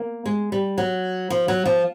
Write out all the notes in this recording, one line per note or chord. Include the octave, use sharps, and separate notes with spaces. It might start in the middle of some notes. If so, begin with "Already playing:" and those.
Already playing: A#3
G#3
G3
F#3
F3
F#3
F3